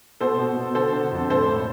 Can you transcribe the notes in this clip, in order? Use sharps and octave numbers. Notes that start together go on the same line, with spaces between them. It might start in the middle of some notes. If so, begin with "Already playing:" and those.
B2 A4 C5
B2
B2
D3 A4 C5
D3
F2
A2 A4 C5
A2